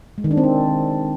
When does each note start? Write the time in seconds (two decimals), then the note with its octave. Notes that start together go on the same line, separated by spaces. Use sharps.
0.18 G#3
0.24 D#3
0.31 D4
0.37 C4
0.44 D4